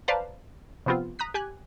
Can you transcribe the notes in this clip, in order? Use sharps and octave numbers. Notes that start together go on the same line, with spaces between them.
B4 C5 D5 F5 A5 A#5
C3 F3 B3 C4 F4
A#5 D#6 F#6 B6
G4 G#5 F#6 G#6